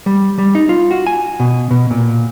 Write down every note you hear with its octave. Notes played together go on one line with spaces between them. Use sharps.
G3
G3
D#4
F4
F#4
G#5
B2
B2
A#2